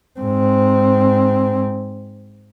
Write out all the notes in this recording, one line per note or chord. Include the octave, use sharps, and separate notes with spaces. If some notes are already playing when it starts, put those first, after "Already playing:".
G#2 C4